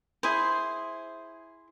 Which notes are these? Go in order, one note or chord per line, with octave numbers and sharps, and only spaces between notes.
E4 G#4 C5